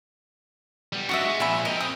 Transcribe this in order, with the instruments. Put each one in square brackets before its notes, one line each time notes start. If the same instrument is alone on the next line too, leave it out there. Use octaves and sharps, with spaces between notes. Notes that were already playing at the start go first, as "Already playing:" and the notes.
[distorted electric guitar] G3 B3
[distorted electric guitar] F#3 D4 [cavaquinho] F#4 D#5 E5
[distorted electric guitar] G#3
[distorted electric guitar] A#2 F3 [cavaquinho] E5 G#5 B5
[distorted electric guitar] C4 A#4 [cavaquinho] D#5
[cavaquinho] D#6